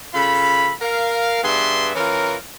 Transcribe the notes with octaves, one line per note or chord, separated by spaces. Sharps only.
C#3 F4 A4 B5
A#4 F5
G2 B3 G#4 D5 E5 C6
E3 C#4 F4 A#4